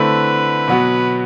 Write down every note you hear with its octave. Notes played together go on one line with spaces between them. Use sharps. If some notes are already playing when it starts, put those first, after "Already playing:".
Already playing: D3 A3 C4 E4 B4
B2 F#3 B3 F#4